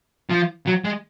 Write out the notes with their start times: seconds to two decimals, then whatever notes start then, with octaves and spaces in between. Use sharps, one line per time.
0.30 F3
0.67 F#3
0.84 G#3